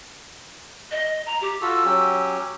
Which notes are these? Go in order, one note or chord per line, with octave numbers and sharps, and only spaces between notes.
D#5
A#5
G4
F4 F#4 A4 E6
F#3 C#4 G4